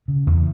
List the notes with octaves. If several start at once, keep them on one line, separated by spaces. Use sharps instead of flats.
C#3
E2